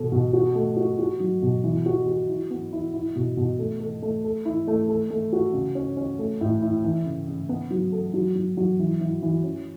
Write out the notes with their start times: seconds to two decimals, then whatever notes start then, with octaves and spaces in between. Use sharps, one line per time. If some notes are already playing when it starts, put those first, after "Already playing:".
Already playing: B2 A4
0.12 B2
0.33 F#4
0.55 A3
0.76 F#4
0.99 F#4
1.20 F#3
1.42 B2
1.64 E3
1.86 F#4
2.07 F#4
2.29 E4
2.50 B3
2.72 E4
2.94 E4
3.15 B2
3.37 B2
3.59 A3
3.80 A4
4.02 A3
4.24 A4
4.45 E4
4.67 A3
4.89 A4
5.10 A3
5.33 F#4
5.53 C#3
5.75 C#4
5.97 C#4
6.19 A3
6.41 A2
6.62 E4
6.84 E3
7.06 C#3
7.27 C#3
7.49 B3
7.70 F#3
7.92 A4
8.14 F#3
8.35 F#3
8.57 F#3
8.79 E3
9.00 E3
9.22 E3
9.44 C#4